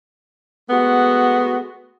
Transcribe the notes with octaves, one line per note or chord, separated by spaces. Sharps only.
G#3 A3 B3 F#4